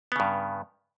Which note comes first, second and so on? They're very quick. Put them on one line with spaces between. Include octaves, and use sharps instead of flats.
B3 C#3 G2